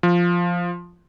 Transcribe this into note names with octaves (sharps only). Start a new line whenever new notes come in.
F3